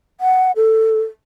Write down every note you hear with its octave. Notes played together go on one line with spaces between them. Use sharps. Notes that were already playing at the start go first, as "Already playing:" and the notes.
F#5
A4